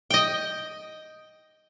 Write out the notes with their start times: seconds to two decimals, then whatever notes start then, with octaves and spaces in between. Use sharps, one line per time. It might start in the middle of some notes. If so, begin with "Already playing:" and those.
0.10 D#5 G5